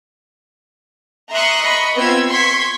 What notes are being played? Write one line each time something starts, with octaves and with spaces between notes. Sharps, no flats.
E5 A#5 C6 C#6 D#6 F#6
D#5 B5 C#6
B3 C4 F4 E6 G#6
C6 C#6 G#6 B6